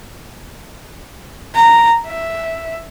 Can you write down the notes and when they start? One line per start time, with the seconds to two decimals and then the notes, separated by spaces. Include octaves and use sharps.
1.55 A#5
2.07 E5